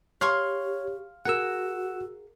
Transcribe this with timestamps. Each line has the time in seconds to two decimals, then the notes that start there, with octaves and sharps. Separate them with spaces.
0.21 G4 C#5 F5 C6 C#6
1.25 F#4 G#4 A#4 F#5 E6